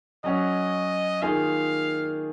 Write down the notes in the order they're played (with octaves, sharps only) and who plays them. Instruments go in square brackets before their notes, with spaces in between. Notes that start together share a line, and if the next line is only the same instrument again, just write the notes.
[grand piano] F#3 C#4 F#4 [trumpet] D#5
[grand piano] D#3 A#3 F4 G#4 [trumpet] F5